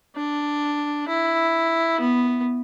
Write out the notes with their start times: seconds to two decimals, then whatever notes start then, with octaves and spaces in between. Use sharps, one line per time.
0.16 D4
1.08 E4
2.00 B3